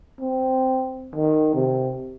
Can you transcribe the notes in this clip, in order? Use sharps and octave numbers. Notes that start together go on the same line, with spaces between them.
C4
D#3
C3